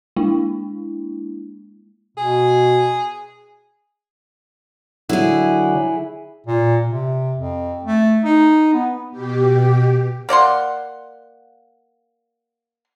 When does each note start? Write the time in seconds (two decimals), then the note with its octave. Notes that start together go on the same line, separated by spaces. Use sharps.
0.16 G#3 A#3 D4 E4
2.17 B2 G#4
5.09 D3 F#3 E4 G#4
6.46 A#2
6.88 C3
7.37 F2
7.83 A3
8.24 D#4
8.73 B3
9.11 B2 G4
10.29 A#3 D5 F#5 C6